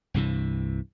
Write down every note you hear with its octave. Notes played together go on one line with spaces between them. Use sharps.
C2 G2 C3 E3